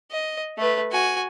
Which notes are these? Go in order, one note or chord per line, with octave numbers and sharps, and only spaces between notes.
D#5
A3 B4
F#4 G#5